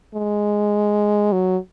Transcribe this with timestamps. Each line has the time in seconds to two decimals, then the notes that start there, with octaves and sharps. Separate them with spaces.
0.15 G#3
1.32 F#3